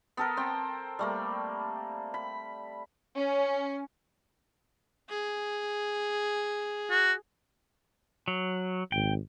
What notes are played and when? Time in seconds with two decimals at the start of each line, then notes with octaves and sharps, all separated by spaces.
0.17 B3 A4 A#4
0.37 C4 G5
0.99 G3 A3 A#3
2.14 B5
3.16 C#4
5.09 G#4
6.90 F#4
8.28 F#3
8.92 G#1 G5